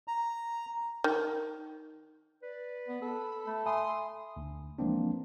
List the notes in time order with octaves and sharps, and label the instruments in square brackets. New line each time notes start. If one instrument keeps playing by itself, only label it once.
[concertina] A#5
[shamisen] D#3
[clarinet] B4 [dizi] D5
[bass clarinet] B3
[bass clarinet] A4 [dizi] B5
[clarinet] A3
[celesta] E5 G#5 B5 [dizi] C6 [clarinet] D#6
[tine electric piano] D2
E3 F3 G#3 A#3 C4 D4